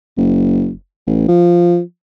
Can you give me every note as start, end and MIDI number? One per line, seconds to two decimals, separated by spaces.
0.17 0.71 30
1.07 1.28 33
1.28 1.80 53